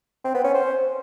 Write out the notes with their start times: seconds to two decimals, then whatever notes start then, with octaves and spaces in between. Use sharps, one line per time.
0.25 C4
0.34 B3
0.44 C#4
0.54 C5